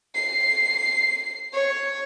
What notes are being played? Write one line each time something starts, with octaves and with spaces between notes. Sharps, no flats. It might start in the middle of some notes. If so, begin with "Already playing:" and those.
C7
C#5